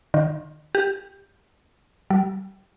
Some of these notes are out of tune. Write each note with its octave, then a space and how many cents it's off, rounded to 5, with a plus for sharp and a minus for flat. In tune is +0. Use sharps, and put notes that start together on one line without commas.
D#3 -25
G4 +10
G3 -35